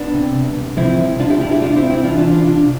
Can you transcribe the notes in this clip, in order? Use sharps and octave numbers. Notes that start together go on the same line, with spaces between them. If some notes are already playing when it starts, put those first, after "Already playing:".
Already playing: B3 D4
C3
C2
C2
F3 C4 E4
C2
C2 D4 F4
E4 G4
C2 D4 F4
E4 G4
C2 D4 F4
C4 E4
C2
C4 E4
E3 D4 F4
D4 F4
C3
D4 F4
C3 D4 F4